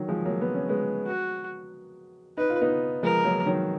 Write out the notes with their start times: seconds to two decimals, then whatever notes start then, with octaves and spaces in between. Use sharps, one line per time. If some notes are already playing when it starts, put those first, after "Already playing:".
Already playing: D#3 F#3
0.08 F3 G#3
0.25 F#3 A#3
0.41 B3
0.55 C#4
0.69 G#3 B3
1.07 F#4
2.37 D#4 B4
2.50 F4
2.61 B3 D#4
3.03 F3 G#3 A#4
3.25 F#3 A#3
3.46 D#3 F#3